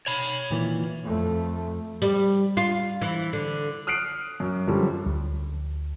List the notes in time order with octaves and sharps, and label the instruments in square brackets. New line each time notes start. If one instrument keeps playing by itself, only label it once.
[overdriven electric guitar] C#5 B5
[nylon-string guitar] A#2 D#3 E3
[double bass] F2 A3
[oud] G3
F4
E3
D3
[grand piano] D#6 F6 F#6 C7 D7
F#2
F#2 D3 F3 G3
[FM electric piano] D2